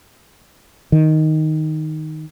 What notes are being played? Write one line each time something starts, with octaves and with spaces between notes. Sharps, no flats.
D#3